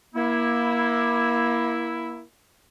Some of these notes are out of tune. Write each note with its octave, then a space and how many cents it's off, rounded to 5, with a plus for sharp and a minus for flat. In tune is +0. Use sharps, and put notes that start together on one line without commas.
A#3 +25 E4 +0